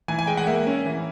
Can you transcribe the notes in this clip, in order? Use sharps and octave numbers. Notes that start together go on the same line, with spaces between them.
E3 G#5
G#5
G#3 G5
F#5
A#3 E5
C#4
E3